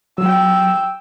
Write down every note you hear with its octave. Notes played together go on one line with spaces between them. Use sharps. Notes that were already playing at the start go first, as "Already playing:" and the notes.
F#3 G5 E6